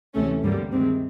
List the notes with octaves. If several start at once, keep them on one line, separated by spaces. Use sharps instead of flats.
D2 C3 E3 A3 C#4
G2 D3 G3 A#3
C3 D#3 G#3 C4